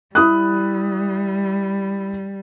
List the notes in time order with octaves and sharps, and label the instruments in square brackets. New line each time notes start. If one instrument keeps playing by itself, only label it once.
[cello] G3 [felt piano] E4 D#6 F#6